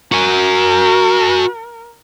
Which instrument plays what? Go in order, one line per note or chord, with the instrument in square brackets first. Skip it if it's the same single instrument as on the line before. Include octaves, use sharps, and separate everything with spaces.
[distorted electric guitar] F#4 G#5 [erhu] A#4